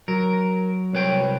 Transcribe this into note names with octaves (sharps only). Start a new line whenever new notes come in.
F#3 A#4
C2 B4 C#5 G5